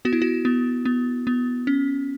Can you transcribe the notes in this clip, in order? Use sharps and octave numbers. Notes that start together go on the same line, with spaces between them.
B3 F#4
E4
F#4
B3
B3
B3
C#4